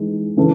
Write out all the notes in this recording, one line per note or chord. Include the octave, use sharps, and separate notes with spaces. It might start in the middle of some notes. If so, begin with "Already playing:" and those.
Already playing: E3 G#3 D#4
C#3 E3 A3